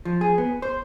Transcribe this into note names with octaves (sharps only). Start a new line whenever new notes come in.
F3
G#4
B3
C5